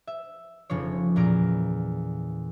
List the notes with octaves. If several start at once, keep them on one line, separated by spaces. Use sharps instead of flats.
E5
F1 C#3 F3 C#5
E2 A#2 A#5 F6 D7